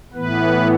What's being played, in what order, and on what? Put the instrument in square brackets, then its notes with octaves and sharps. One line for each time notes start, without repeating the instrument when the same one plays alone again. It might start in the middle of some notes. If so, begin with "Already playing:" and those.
[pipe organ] A2 E3 B3 B4